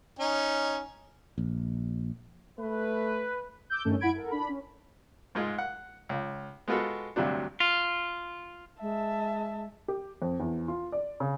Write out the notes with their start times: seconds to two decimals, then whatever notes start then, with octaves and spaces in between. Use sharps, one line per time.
0.19 C#4 D#4 G#5
1.38 A#1
2.59 A3 B4
3.70 D6 E6 G6
3.85 G2 D#3 A3 C#4 A4
4.00 F#2 E4 F#5 B5 G#6 D7
4.15 A4 A#4 F#5
4.31 D4 B5
4.49 C#4
5.35 G#2 G#3 F4
5.58 F#5
6.09 C#2
6.68 G#3 B3 F4 F#4 A4
7.16 D2 G2 C3 F#3 D4
7.60 F4
8.81 G#3 E5 A5
9.88 G4
10.22 F2
10.40 E2
10.68 F4
10.92 D5
11.20 C#3